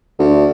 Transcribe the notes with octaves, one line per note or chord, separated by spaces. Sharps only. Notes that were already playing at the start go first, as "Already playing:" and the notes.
D2